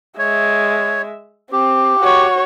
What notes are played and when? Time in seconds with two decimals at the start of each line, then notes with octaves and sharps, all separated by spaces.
0.19 G#3 C#5 E5
1.52 C4 G4
2.00 F#4 C#5